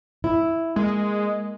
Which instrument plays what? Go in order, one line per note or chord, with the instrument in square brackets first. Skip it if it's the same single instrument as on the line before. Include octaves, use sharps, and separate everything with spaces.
[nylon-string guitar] E4
[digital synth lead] G#3 [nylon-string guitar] A#3